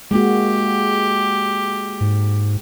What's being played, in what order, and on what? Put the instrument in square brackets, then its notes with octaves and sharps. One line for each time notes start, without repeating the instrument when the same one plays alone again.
[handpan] G#3 A#3 F#4 [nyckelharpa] G4
[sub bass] G#2